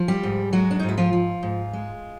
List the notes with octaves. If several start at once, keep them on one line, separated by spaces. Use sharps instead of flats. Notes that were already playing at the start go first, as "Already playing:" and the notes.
Already playing: F3
G3 G4
G#2
F#3 G#3 F#4
D4
G#2 D#4
E4
F3 F4
F3
G#2
G#3